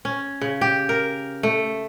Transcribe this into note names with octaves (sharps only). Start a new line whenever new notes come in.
C#4
C#3
G4
A#4
A3